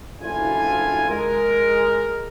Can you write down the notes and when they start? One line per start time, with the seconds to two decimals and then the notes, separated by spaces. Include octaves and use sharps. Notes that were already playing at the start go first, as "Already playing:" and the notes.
0.21 F#1 D2 D3 E4 F4 G#5
1.10 G#3 A#4